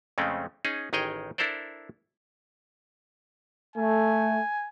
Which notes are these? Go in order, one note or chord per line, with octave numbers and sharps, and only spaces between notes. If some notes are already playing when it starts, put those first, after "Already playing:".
F2 C#3 G#3 A3 C4 C#4
C#4 D#4 G#4
A1 D#3 G#4 C#5 D#5 G5
D4 E4 A4 A#4 C5 D5
A3 G#5